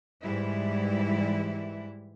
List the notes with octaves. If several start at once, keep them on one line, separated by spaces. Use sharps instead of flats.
G#2 E3 G3 E4